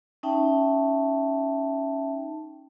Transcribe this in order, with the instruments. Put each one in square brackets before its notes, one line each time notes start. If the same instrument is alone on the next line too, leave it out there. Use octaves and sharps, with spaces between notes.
[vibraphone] C#4 D#4 E5 G5 A5